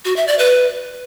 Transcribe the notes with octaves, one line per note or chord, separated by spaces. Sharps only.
F#4
E5
D5
B4